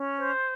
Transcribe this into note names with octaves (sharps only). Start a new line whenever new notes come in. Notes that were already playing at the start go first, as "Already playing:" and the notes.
Already playing: C#4
C5